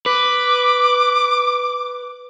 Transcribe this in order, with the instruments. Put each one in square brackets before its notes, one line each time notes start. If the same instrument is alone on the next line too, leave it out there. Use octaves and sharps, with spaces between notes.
[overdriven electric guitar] B4 [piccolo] D6